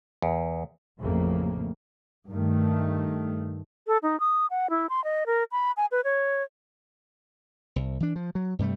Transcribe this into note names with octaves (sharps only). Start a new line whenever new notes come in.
E2
A1 F2 A2 C#3 A3 A#3
G2 D#3 A3
A4
D#4
D#6
F#5
E4
C6
D#5
A#4
B5
G#5
B4
C#5
C2
E3 D4
F3
F#3
G2 C3 G3 A3